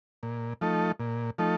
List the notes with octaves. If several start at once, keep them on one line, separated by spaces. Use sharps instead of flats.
A#2
F3 A3 D#4 A4
A#2
F3 A3 D#4 A4